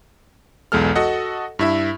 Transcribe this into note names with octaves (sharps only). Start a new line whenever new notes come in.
B1 E2 G#3 A4 F6
F#4 A4 D#5 F#5
G2 E4 E5